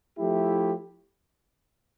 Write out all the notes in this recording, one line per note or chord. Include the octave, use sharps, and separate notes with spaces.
F3 A3 E4 G4